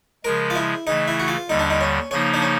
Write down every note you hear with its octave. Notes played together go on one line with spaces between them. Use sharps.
C#3 F3 G#3 A#4
F4
E4
C#3 E3 A3 D#4
E4
F#4
F4
D#2 D3 G3 D#4
D4
D#4
C#4
C#3 F3 A#3 C#4 D#4
D4
C#4